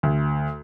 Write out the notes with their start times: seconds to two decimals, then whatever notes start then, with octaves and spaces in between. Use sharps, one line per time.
0.03 D2